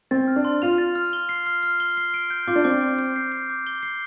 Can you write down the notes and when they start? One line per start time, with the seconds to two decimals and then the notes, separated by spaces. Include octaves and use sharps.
0.11 C4 A6
0.28 F6
0.36 D4
0.45 C6
0.62 F4 F7
0.78 A6
0.95 F6
1.13 G7
1.29 C7
1.47 F6
1.63 F6
1.80 G7
1.97 C7
2.14 D7
2.30 G6
2.47 F4 D6
2.56 D4
2.65 C4 D6
2.81 D7
2.98 G6
3.16 C7
3.32 G6
3.49 D6
3.67 G7
3.83 C7